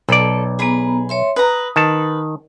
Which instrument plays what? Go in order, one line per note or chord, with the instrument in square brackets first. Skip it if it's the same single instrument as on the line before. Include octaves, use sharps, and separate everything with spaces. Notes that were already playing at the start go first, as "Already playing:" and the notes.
[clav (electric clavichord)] B1 D5 [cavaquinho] A4
[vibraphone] B3 A#5 [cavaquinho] G#4 B5
[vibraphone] C#5 E5 C6
[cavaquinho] B4 A#5 [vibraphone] D#6
[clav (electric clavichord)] D#3 A5 [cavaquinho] B4